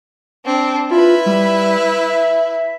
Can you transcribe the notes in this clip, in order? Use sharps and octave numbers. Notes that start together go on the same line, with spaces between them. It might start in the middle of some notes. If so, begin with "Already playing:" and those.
C4 D4
E4 F4 B4
G3
E5